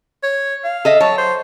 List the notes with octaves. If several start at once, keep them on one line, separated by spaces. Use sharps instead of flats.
C#5
F5
A4 D#5 E5
F#3 C#5 A5
C5